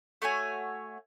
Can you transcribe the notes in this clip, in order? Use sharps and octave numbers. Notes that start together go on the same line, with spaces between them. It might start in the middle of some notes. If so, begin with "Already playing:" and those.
A3 F#4 C#5 G#5